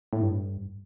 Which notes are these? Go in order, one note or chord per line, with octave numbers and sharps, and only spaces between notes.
A2
G2